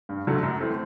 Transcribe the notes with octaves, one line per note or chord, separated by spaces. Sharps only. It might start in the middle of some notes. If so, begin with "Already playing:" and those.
G2
D3 F#3 A3
F#2
E3 A3 C4